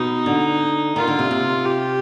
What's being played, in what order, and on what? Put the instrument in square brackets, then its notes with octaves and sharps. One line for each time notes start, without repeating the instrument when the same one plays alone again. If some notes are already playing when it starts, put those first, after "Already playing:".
Already playing: [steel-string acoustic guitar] B2 [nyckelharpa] D#4
[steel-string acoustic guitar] D3
[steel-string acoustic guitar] D#3 [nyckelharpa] F4
[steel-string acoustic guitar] D3
C3
C3
[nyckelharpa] G4